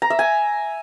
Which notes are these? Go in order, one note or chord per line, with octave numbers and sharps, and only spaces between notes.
A#5
E5
G#5